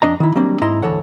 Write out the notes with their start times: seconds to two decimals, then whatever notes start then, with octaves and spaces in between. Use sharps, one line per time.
0.02 F2 D4 D#5 A#5
0.20 D#3 E4
0.35 F#3 G3 A#3 C4 D4
0.61 G#2 E4 D#5 A#5 C6
0.82 D2 E3 A4 C#5 F#5